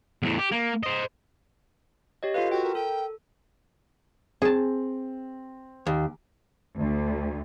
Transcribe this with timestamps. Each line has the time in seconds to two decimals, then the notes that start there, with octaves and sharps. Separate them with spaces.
0.23 E2 A2
0.39 G4
0.52 A#3
0.83 C5 D#5
2.23 G4 C#5 D#5
2.34 F4 A4 B4 F5
2.51 F#4 G5
2.64 A#4
2.75 A4 G5
4.42 C4 G#4 A5
5.87 D#2
6.77 D2